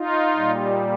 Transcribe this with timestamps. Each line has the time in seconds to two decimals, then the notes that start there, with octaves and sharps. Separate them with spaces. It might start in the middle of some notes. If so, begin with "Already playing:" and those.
Already playing: D#4 F4
0.35 A#2 G3